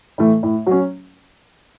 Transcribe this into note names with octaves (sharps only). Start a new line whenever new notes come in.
A2 E3 A3
A2
F#3 C#4